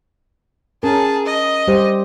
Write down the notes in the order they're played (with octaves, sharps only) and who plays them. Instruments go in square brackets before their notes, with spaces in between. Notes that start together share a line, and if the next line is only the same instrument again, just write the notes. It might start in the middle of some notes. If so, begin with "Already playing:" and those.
[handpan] C#4 A#4 [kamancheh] G#4 A5
[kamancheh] D#5
[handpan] G3 G4 C5